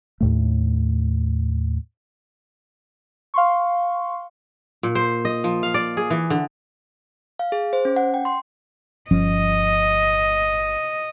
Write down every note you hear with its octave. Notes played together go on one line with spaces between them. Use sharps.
D#2 A2 A3
F5 C6 C#6
A#2
C5
D#5
F3
F5
D5
G#4
E3
D3
F5
G#4
C5
C#4
F#5
G5
C6
G1 F3 C#4 D#5